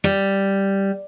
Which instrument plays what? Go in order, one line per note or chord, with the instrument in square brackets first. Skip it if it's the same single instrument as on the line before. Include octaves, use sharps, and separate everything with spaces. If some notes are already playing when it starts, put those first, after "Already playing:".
[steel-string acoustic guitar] G3